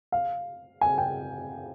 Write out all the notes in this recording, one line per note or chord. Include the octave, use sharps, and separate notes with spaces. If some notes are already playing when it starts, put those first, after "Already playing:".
F5
G#5
G5